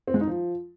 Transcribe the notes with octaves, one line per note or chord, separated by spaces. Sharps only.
C4
G#3
D#4
F3